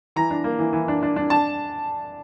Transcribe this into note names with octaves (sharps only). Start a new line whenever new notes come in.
E3 A#5
D4
A#3
E3
E3
D4
D4
D4
D4 A5